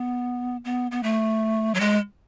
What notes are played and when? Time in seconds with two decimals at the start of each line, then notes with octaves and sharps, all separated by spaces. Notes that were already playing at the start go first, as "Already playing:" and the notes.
Already playing: B3
0.65 B3
0.91 B3
1.03 A3
1.75 F#3
1.80 G#3